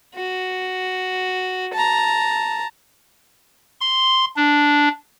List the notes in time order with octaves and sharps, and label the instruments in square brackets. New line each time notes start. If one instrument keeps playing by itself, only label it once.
[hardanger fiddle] F#4
A5 A#5
[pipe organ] C6
D4